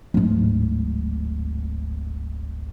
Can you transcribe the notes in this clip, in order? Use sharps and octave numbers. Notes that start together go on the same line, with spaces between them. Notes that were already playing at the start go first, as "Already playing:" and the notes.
D1 G#1